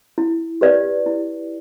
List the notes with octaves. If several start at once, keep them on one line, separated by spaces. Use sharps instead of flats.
E4
G4 B4 D5
E4